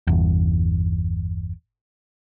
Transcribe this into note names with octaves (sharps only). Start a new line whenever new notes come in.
G1 E2